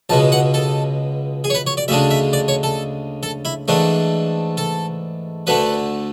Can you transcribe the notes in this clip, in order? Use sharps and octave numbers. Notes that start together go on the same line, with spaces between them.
C#2 B2 G#3 A5
F#5
A4
G#4
C#5
B4
C#5
D5
D2 C#3 G#3 D4 E5
E5
D5
C#5
A4
A4
E4
G#2 E3 A3 D4
A4
D2 D3 A3 B4